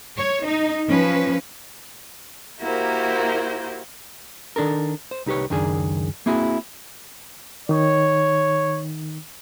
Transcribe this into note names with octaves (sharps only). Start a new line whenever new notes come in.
C#5
D#4
F3 C#4 B4
A#3 E4 F#4 G4 A#4 C5
D#3 D4 A4 A#4
C5
C2 D#4 G4 B4 C#5
C#2 F#2 D#3 D4 G#4
A#3 C4 E4 F#4 G#4
D#3 D#4 C#5